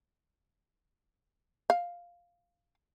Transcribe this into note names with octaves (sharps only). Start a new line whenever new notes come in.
F5